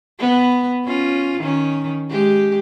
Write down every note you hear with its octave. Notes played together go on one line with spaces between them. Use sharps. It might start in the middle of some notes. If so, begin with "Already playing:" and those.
B3
C#4 F4
D#3 C#4
G#3 G4